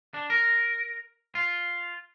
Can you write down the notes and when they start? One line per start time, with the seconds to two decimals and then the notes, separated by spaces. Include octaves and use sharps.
0.14 D4
0.30 A#4
1.35 F4